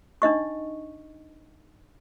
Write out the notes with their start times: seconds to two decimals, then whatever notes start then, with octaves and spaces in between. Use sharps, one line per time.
0.22 D4 D#4 D#5 C#6